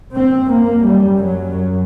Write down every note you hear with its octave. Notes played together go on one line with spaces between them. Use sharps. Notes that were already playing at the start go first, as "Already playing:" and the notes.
F#2 C4
A#3
G3
F#3